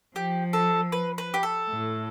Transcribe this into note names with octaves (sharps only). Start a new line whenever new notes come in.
F3 G4
A4
B4
B4
G4
A4
A2